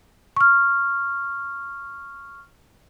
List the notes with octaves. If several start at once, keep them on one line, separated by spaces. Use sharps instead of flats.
C#6 F6